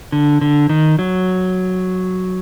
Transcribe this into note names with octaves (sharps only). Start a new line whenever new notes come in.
D3
D3
D#3
F#3